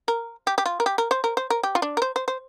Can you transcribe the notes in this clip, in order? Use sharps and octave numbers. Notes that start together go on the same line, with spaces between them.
A#4
G4
G4
F4
A#4
G4
A#4
C5
A#4
C5
A#4
G4
F4
D4
A#4
C5
C5
C5